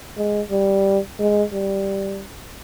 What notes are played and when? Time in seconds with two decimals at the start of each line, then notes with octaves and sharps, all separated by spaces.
0.17 G#3
0.51 G3
1.19 G#3
1.53 G3